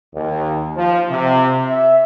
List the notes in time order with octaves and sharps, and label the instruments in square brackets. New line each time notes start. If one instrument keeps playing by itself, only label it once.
[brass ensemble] D#2
F3
C3
E5